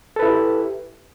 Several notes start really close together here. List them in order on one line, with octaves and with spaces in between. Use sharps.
A4 B4 E4 E5 G4